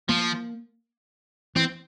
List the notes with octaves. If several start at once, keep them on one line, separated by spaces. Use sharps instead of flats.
F3 A#3
E3 C4